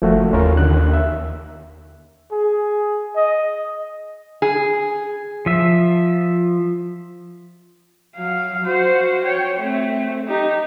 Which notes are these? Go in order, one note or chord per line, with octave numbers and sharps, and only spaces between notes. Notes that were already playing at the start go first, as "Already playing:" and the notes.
F#1 F3 A3 F#4
D#2 C#4 F4 A#4
D3 F#6
E5
G#4
D#5
G#4
F3 E5
F#3 F5
F#4 C5
C#5 G5
A3 C4
D#4 G4